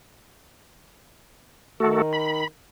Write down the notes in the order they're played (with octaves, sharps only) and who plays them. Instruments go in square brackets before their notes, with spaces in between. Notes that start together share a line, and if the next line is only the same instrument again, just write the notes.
[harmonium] D#3 [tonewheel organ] A3 F#4 A4
[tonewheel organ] B5